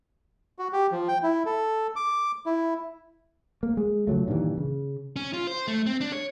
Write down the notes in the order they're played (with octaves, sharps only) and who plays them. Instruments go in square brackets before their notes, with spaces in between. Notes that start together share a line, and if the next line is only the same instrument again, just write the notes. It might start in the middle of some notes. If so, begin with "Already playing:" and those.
[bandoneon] F#4
G4
F3
G5
E4
A4
D6
E4
[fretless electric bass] A#3
G#3
C#3 F3 F#3 A3
G2 A#2 D#3 E3
C#3
[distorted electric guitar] C#4
F4
C5
A3
C4
D4
C#5